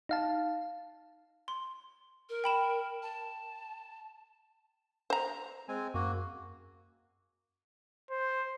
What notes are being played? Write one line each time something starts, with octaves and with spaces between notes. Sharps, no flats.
D#4 F5 A5
C6
A#4
G5 B5 E7
A5
C5 A#5
G#3 C4 G#5
F#2 A#3 F#4
C5